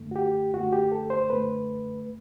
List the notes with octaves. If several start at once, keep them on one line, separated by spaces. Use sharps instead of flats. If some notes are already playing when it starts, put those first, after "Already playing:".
Already playing: F#2 D3 A3
F#4
G4
F#2 D3 A3 F#4
G4
A4
C5
F#2 D3 A3 B4